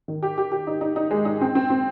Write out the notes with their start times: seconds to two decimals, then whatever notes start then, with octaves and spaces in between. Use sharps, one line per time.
0.08 D#3
0.23 G4
0.38 G4
0.52 G4
0.67 D#4
0.81 D#4
0.96 D#4
1.11 G#3
1.25 D#4
1.41 C4
1.55 C4
1.70 C4